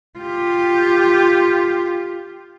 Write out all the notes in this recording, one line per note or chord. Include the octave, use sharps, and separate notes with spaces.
F4 G4